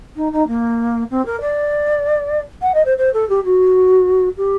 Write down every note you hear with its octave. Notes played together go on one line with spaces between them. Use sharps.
D#4
D#4
A#3
C4
A#4
D5
F#5
D#5
C5
C5
A4
G4
F#4
G4